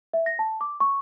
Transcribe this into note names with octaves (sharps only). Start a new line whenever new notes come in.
E5
A#6
A5
D6
C#6